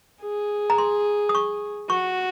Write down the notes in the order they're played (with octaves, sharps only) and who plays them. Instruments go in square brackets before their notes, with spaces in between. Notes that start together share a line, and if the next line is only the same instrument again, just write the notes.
[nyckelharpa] G#4
[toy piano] A#5
C6
D#6
C#6
[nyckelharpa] F#4 [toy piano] C#6